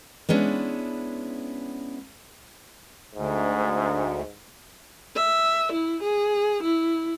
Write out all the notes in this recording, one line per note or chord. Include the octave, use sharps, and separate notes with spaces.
G#3 B3 C#4 D4 E4
D2 G#2
E5
E4
G#4
E4